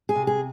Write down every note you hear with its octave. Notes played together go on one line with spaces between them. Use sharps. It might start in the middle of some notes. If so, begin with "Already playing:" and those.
G#4
C3
G#4